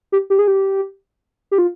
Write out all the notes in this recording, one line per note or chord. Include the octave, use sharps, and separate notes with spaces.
G4
G4
G#4
G4
G4
F4